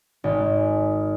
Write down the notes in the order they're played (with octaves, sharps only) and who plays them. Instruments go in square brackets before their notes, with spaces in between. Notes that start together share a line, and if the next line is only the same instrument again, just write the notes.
[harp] G#1